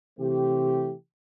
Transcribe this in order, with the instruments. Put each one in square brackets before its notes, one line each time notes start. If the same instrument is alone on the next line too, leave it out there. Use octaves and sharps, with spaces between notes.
[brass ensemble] C3 E3 A3 C4 G4